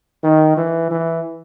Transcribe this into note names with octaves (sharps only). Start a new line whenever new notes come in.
D#3
E3
E3